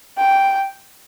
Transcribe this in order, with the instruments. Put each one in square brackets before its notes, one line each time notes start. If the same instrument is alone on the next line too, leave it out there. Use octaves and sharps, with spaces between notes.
[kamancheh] G5